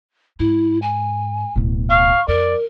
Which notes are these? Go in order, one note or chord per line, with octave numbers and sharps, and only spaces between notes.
G#2 E4
G#5
D1 B2
F5 C#6
F2 A#4 D5